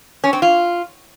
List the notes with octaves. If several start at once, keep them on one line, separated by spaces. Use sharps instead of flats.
C#4
C4
F4